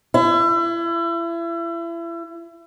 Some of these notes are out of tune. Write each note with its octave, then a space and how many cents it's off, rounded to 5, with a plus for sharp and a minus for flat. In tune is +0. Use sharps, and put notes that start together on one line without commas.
E4 +35